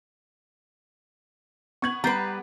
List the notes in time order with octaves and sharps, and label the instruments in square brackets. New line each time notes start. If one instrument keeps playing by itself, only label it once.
[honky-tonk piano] B3 G#6 [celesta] C#6 F#7
[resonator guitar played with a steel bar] G3 B4 [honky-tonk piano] B3 [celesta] A#5 G6 C7